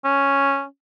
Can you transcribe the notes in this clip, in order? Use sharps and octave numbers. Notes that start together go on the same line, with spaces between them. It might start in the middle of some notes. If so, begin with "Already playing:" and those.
C#4